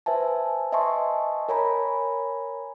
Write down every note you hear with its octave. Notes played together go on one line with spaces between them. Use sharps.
B4 C5 E5 G#5 A5
D#5 E5 G#5 A5 C6 C#6
A#4 C#5 G#5 A#5 B5